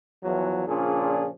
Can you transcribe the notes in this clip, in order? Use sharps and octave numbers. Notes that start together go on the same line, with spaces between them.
E2 F3 F#3
A#2 C#3 F3 C#4 D4 G#4